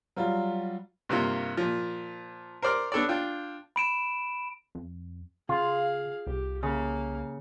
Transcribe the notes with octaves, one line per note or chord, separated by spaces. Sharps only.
F#3 G3 F4
G2 C3 A#3 F4
A#2 F3
A#4 C5 D5 F6
B3 D4 A4 C#5 D5
D4 F4 G5
B5 D7 E7
F2
C#3 F4 G#4 F5
C2 G4
C#3 A#3 F5